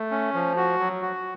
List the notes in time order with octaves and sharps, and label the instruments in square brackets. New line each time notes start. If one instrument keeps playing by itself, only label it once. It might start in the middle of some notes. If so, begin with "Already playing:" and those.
Already playing: [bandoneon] A3
C#4
F3
F#4
F#3
F#4